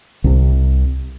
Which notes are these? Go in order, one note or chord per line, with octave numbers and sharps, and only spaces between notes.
C2 C3